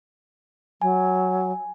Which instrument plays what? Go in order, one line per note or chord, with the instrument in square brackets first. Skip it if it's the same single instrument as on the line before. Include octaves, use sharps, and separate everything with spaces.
[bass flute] F#3 [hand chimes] G#5